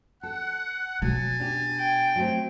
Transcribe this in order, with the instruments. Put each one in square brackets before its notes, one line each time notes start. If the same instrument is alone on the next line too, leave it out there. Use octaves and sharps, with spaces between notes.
[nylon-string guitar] A4 [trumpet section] F#5
[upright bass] B2 [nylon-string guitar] F#3 [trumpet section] G#5 A5
[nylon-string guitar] D4 G4
[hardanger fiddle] G5
[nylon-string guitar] F#3 A3 C4